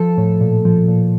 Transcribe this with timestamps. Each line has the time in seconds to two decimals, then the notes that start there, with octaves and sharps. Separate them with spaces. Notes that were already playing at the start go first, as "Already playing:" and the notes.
Already playing: F3 A4
0.18 A2
0.41 A#2
0.65 F3
0.88 A#2